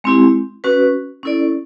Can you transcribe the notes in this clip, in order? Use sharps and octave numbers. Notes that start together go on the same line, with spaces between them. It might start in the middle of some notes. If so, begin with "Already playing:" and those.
G#3 C4 E4 G4
C#4 F#4 B4
C#4 E4 A4 D5